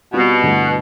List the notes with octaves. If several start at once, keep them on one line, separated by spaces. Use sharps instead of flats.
B2 G3 C4 F4
G2 D3 A3 E4